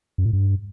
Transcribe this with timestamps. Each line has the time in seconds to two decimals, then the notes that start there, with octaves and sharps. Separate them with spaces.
0.18 F#2
0.26 A2
0.33 G2